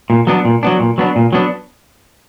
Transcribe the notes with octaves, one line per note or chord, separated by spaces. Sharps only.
A#2
F#3 B3 D4
A#2
F#3 B3 D4
A#2
F#3 B3 D4
A#2
F#3 B3 D4